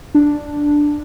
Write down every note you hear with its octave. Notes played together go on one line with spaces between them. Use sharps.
D4